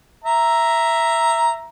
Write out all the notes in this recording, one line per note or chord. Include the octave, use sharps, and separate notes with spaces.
E5 A#5